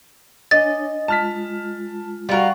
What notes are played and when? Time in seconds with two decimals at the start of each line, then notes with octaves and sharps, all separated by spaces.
0.51 D4 C#5 D#5 G#5 A6
1.08 G#3 F4 A5 F6 B6
2.29 G3 F4 F#4 A#4 G5 C#6